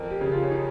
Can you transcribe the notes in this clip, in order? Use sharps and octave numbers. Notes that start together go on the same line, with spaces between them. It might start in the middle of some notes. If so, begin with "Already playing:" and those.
Already playing: F2 A#4
G4
C#3
F4
C#4
D#4